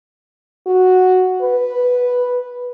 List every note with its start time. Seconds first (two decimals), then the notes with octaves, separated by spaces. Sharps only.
0.67 F#4
1.42 B4